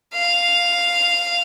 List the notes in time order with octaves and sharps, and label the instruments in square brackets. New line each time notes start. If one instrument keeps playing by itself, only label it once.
[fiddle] F5